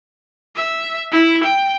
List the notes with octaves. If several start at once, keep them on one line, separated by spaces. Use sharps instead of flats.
E5
E4
G5